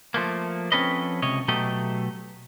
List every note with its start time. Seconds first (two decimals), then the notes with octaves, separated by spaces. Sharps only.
0.14 F3 A3 A#3
0.72 F3 C4 C#4 A4 B4 D#5
1.22 C#2 C3 C#5 D#5
1.48 B2 F#3 A3 G4 A4 D#5